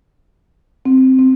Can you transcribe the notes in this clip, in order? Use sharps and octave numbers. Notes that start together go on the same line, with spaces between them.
C4
C4